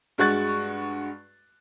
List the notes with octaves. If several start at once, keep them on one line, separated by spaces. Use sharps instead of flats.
G2 G#3 F#4 C#6 F#6 A6